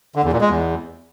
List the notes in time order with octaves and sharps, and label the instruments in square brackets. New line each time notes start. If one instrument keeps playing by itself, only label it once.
[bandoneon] D3
E2
A#2
G#3
E2